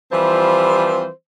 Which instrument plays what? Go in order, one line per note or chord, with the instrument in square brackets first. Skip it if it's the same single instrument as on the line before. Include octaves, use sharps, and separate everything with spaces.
[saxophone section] E3 F3 G3 C4 F4 C5